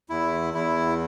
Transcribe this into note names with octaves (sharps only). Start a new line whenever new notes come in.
E2 E4
E2 E4